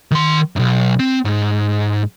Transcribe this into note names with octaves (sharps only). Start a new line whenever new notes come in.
D#3 C6
B1 F#2
C4
G#2